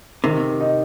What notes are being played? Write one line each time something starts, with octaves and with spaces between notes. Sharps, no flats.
C3 D#3
D#4